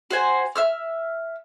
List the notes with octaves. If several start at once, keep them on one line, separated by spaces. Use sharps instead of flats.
F#4 C5 G#5
E5 E6 F6